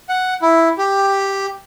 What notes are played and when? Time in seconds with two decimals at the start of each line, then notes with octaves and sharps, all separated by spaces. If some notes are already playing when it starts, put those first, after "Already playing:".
0.09 F#5
0.42 E4
0.78 G4